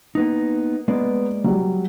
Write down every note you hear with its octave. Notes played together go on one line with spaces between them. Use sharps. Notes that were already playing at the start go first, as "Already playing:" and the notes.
A#3 B3 D#4
G#3 A#3 B3 D5
F#3 G3